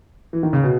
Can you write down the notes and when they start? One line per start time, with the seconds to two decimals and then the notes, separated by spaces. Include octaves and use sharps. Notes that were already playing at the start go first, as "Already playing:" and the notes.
0.33 E3
0.43 D#3
0.53 C#3
0.63 B2